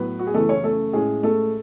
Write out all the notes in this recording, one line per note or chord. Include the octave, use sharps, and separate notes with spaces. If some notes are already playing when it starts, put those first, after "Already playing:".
Already playing: A2 F#3 B3 B4
F#4
G#4
F#2 C#3 E3 A3 A4
C#4 C#5
A3 A4
A2 G#3 C#4 G#4
A3 A4